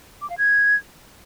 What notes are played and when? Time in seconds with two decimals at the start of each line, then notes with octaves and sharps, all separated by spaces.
0.22 D6
0.30 F5
0.38 G#6